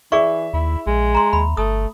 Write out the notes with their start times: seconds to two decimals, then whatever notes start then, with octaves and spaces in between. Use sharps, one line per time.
0.12 E3 G#4 D5 E5 C#6
0.53 D#2 E4
0.86 A#1 G#3
1.15 A#5 C6
1.33 D#2 B5
1.57 G1 A3 D#6